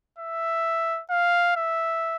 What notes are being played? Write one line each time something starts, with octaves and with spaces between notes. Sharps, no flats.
E5
F5
E5